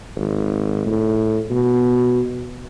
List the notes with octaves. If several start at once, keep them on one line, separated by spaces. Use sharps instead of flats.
G#1
A2
B2